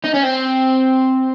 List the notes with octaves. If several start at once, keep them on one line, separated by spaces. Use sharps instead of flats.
D#4
C#4
C4